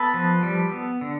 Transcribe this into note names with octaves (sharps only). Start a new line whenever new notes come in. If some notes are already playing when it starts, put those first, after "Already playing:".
Already playing: B3 A4 B4
F3
G3
B3
D3